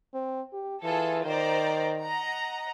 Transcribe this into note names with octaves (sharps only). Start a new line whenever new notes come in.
C4
G4
E3 F4 G#4 A4
D#3 C5 D5 A#5
D#5 F#5 A#5